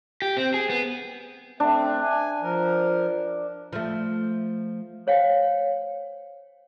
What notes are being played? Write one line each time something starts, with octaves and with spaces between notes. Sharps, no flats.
G4
C4
G#4
B3
A3 C4 D4
G#5
F3 A#4
F3 A3
C5 C#5 F5 G5